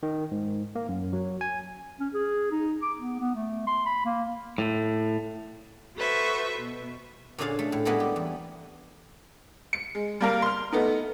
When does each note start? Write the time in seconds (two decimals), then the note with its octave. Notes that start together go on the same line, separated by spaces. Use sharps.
0.03 D#3
0.31 G#2
0.75 A#3
0.89 F#2
1.13 F#3
1.41 G#5
2.00 C#4
2.14 G#4
2.51 D#4
2.83 D6
2.98 B3
3.20 B3
3.35 A3
3.67 C6
3.86 B5
4.05 A#3
4.58 A2
5.96 F#4 A4 B4 C5 E5 C#6
6.58 B2
7.38 A#2 D3 C#4 G#4 F5 A5
7.59 A3
7.72 A2
7.85 G3 G#3 A#3 B3 E4 F#4
8.00 G4
8.16 E2
9.73 C#7
9.95 G#3
10.21 G3 A#3 A#4
10.42 C6 F6
10.72 A3 B3 D#4